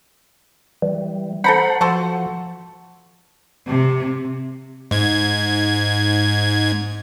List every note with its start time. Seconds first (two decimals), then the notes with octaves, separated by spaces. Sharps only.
0.82 E3 G3
1.44 A4 C5 F#5 A#5 B5
1.81 F3 F#4 A4 C5
3.66 C3
4.91 G#2 G#6